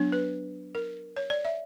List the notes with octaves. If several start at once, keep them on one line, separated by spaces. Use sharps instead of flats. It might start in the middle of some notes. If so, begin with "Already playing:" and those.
Already playing: F#3 B3 D4
B4
A#4
C#5
D5
E5